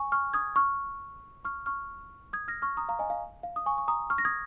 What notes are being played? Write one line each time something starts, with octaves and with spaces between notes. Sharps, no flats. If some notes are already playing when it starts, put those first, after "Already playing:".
Already playing: G#5 C#6
C#6 F6
D#6 G#6
C#6 F6
C#6 F6
C#6 F6
D#6 G#6
F6 A#6
C#6 F6
A#5 D#6
F5 A#5
D#5 G#5
F5
F5
D#6
G#5 C#6
C#6
A#5 D#6
C#6 F6
A#6
D#6 G#6